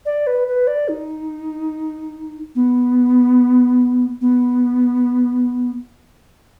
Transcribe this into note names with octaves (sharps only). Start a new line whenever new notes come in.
D5
B4
B4
D5
D#4
B3
B3